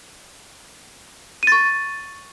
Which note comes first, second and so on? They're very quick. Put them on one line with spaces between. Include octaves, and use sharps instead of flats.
D#7 A6 C#6